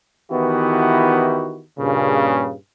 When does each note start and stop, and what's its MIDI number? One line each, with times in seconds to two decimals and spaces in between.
0.31 1.61 51
0.31 1.61 52
0.31 1.61 59
0.31 1.61 64
0.31 1.61 66
0.31 1.61 67
1.79 2.54 43
1.79 2.54 46
1.79 2.54 49